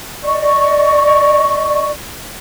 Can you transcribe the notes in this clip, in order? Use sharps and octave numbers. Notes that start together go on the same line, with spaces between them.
D5 D#5 C#6